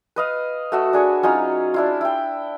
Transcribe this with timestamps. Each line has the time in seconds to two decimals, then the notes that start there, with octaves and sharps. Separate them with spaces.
0.16 B4 D#5 F5
0.72 A3 F#4 E5
0.93 D4 G#4 C#5
1.23 F#3 C#4 D#4 F4
1.74 D4 E4 F4
2.01 E4 G5